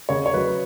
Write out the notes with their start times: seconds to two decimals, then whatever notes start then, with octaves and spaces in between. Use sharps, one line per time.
0.09 C#3 C#5
0.26 C#5
0.34 F#3 B4